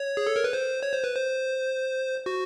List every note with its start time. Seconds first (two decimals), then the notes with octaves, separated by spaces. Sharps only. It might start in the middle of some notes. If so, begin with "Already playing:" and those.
Already playing: C#5
0.17 G#4
0.27 A4
0.36 A#4
0.44 B4
0.53 C5
0.83 C#5
0.93 C5
1.04 B4
1.15 C5
2.26 F#4